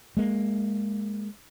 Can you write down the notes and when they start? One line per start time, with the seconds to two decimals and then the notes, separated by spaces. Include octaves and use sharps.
0.17 G#3 A#3